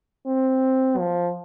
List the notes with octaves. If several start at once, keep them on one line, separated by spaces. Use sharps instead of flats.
C4
F3